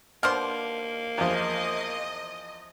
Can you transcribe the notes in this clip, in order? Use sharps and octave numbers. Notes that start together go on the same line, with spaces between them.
B2 A#3 D4 C5 F6
E2 F3 D#5